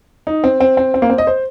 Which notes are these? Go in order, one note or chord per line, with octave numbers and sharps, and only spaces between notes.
D#4
C4
C4
C4
C4
A#3
C4
D#5
C5